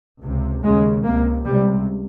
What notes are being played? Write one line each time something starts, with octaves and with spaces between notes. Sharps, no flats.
C#2 C3
D#2 C#3 G#3
C#2 C3 A#3
C#2 C3 G3